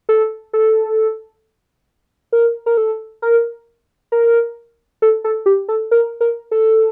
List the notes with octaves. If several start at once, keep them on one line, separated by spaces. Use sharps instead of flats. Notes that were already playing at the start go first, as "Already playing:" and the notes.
A4
A4
A#4
A#4
A4
A#4
A#4
A4
A4
G4
A4
A#4
A#4
A4